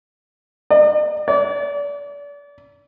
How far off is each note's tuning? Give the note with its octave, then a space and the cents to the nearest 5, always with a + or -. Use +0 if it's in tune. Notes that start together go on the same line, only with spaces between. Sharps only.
D5 +45
D5 -35